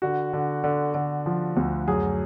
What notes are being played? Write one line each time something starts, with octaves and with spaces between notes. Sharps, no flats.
D3 F#4
D3
D3
D3
F3
D2
F#2 G#4